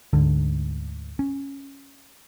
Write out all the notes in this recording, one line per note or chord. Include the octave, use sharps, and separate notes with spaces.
D2 G#2 D3
C#4